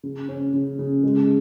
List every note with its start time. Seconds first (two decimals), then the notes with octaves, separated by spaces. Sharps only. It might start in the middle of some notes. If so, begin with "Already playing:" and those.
0.03 C#3
0.29 C#4
0.54 C#3
0.79 C#3
1.04 G#3